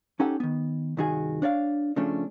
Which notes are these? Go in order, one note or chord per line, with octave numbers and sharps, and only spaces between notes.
C#4 D#4 G4 A4 F#5
D#3 B3
C2 G2 D#3 F#4 G#4 G#5
D4 C#5 D5 F5
C#3 F3 A3 C#4 D4